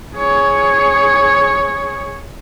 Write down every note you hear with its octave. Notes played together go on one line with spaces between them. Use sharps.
G#4 C#5